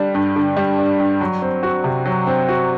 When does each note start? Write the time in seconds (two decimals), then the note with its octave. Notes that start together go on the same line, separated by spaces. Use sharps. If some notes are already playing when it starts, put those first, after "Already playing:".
Already playing: D3 G3 D4
0.15 G2
0.36 D3
0.57 G3
0.78 D4
1.00 G2
1.21 F#3
1.42 C4
1.63 F#4
1.84 C3
2.06 F#3
2.27 C4
2.49 F#4